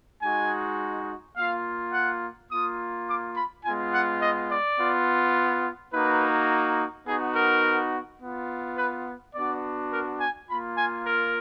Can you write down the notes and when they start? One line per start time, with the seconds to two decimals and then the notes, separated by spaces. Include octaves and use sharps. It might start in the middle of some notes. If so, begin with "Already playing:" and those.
0.22 G#3 D#4 F#4 G#5
1.36 A#3 F4 F5
1.93 F#5
2.50 A#3 F4 D#6
3.08 D6
3.36 B5
3.65 G#3 B3 F4 G#5
3.93 F#5
4.22 D#5
4.50 D5
4.79 B3 F4
5.93 A#3 D#4 F#4 B4
7.07 B3 D#4 F#4 G#4
7.36 A#4
8.21 B3 F4
8.78 B4
9.35 B3 D4 F#4 D5
9.92 A#4
10.20 G#5
10.49 A#3 F4 B5
10.78 G#5
11.06 A#4